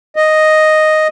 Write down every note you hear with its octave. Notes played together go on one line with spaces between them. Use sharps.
D#5